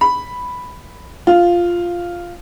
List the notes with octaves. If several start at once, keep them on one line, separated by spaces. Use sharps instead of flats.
B5
F4